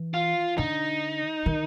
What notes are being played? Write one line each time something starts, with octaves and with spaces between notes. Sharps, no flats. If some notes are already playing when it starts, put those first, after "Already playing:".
Already playing: E3
F4
D3 D#4
D#3